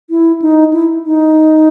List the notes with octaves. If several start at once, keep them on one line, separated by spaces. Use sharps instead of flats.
E4
D#4
E4
D#4